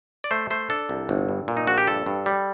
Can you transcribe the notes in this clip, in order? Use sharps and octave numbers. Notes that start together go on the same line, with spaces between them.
D5
A3 C5
A3 C5
D4 A4
C2
G1
G2
A#2
D#4
A#1 F#4
G4
G2 A4
G2
G3